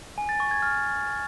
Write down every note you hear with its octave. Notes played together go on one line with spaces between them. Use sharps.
G#5
A6
C#6
G#6
F6